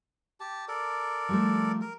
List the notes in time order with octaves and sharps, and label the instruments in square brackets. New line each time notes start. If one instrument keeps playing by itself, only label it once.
[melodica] G4 A5
A4 A#4 D5
[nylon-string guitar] F3 G3 A3
[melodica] A#4